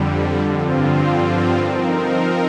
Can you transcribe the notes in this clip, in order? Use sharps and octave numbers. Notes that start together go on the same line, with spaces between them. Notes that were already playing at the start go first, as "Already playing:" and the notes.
Already playing: F2 D3 G3
G2 D3 F3 C4 F4
F3 C4 D#4 A#4